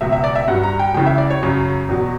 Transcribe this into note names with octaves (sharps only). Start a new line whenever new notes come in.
C#2 B2 F#3 E5
E5
D5
E5
G2 F#3 F#5
A#5
G5
C#2 C#3 E3 G5
E5
D5
C#5
F#2 C#3 F#3
E2 B2 F#3